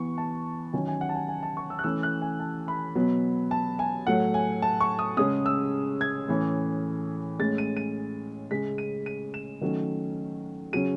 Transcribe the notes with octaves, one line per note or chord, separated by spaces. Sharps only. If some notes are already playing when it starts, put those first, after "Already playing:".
Already playing: E3 B3 C#6
A5
D#3 F#3 C#4 G#5
G#5
F#5
A5
G#5
G#5
A5
C#6
E6
F#6
E3 A3 C#4 E6
F#6
G#5
A5
B5
B2 F#3 B3
A5
G#5
A2 F#3 A3 F#5
G#5
A5
C#6
D#6
C#3 G#3 C#4 D#6
E6
G#6
A2 E3 A3 C#4
A2 G#3 C#4 A6
D#7
D#7
C#3 G#3 C#4 B6
D#7
D#7
E7
D#3 F#3 A3 C#4
C#3 F#3 C#4 D#7